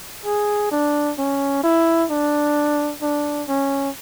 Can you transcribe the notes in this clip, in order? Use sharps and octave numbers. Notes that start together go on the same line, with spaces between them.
G#4
D4
C#4
E4
D4
D4
C#4